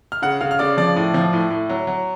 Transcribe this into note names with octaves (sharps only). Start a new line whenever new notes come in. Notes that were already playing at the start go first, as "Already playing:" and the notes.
F6
C#3 F#5 F#6
C#3 F5 F6
F6
C#3 D5 D6
F3 D5 D6
A2
F3
A2
A2
F#3
F#3